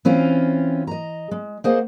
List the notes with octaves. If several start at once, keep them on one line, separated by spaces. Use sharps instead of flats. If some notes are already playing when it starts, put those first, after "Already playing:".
E3 C4 C#4 F4
D#5 A#5
G#3
A#3 G#4 C5 D#5 F#5